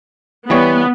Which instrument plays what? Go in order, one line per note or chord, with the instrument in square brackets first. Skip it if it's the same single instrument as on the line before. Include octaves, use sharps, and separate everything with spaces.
[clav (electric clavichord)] E3 G3 C#5 [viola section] B3